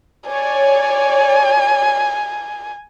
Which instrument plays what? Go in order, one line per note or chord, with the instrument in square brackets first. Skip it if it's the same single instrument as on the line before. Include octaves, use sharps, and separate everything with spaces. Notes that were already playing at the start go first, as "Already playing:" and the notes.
[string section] C#5 D5 [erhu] G#5